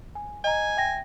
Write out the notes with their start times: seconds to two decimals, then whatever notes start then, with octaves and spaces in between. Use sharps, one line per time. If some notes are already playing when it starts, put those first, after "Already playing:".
0.15 G#5
0.44 D#5 G#5 A#5
0.77 E5 G5 A#6